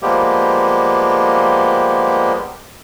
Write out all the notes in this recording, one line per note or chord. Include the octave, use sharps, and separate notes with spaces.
F3 G3 G#3 A#3 B3 G4